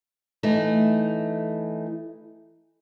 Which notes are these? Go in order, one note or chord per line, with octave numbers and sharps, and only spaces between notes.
E3 A3 D#4